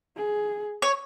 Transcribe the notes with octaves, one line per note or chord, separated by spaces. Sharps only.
G#4
C#5